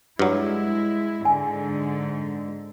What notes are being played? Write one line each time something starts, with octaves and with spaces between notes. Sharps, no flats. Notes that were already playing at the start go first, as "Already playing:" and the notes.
G2 F#3 G#3 E4
G#2 D3 G#5